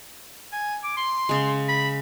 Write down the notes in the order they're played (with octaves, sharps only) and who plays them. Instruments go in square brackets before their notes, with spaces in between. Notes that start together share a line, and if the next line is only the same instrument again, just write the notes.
[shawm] G#5
D6
C6
[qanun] C#3 G#3
[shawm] B5